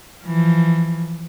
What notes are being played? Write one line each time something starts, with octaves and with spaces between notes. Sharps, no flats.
E3 F3